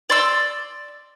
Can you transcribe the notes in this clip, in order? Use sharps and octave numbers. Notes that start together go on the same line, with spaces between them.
D5 C6 E6